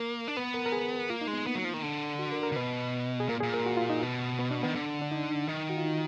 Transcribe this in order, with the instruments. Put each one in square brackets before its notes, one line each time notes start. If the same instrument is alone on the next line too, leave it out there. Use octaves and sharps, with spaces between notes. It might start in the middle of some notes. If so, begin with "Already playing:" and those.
Already playing: [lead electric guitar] A#3 [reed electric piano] A#4
[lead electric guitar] D4
[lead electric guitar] B3 [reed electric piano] B4
[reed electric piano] A#4
A#4
G#4
[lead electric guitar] A#3 [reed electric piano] F4
[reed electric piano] D#4
[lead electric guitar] G#3
[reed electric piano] B3
[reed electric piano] A#3 [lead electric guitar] B3
[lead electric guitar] F#3
F3
D#3
D3
[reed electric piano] F#4
A#4
A#4
[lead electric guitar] D3
[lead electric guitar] B2 [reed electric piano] B4
[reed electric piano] G#4
[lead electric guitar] A#2 [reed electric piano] A#4
[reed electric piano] G#4
[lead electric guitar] A#2
[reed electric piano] A#4
F#4
F4
D#4
[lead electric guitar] B2 [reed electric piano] B3
[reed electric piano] B3
D4
[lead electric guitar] D#3 [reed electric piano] B3
[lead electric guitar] D3
[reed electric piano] D4
D#4
[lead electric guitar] D#3
[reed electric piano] F#4
F4
D#4